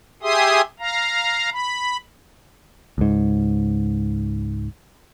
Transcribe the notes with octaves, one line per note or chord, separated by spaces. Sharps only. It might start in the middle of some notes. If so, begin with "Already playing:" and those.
G4 G#4 E5 C6 D#6
F5 A#5
B5
C#2 G#2